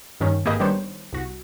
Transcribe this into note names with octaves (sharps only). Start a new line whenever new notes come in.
G2 D#3 C#4
G#1 A#3 G4 G#4 B4 D#5
D#3 G3 B3 D4 C5 C#5
C2 F#4